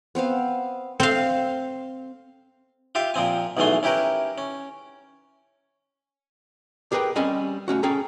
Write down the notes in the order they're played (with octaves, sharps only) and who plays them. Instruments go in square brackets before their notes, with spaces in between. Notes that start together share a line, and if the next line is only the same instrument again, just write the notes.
[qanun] B3 C4 C5 F5
[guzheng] C4 F5
[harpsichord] F4 G4 E5 F5
A#2 F3 C4 G#5
B1 E2 E3 A3 G#5 C6
C#4 E4 G4 A#4 B4
C#4
[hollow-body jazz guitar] G4 G#4 A#4 B4 G5
G3 C4 C#4 D#5 G#5 B5
A3 A#3 C#4 F#4
C#4 G#4 A4 G5 A#5